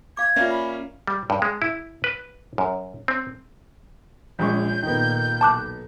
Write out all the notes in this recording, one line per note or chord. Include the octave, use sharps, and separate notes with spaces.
F5 D6 G#6
A#3 C#4 F4 D5 E5 F5
B5
G3
G2
G#3
E4
B4
F#2
C4
A#1 G#3 C#4 C#6 G6
F2 A#2 D#3 A#3 B3
B1 A5 D6 F#6